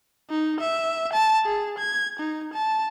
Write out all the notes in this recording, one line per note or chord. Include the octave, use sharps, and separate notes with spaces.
D#4
E5
A5
G#4
G#6
D#4
A5